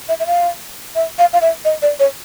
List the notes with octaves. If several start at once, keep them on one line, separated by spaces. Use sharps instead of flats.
E5
E5
F5
E5
F5
F5
E5
D#5
D5
C#5